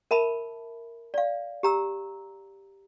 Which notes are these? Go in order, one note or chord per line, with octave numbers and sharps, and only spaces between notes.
A#4 E5 A5 B5
D5 F5
G4 A#5 E6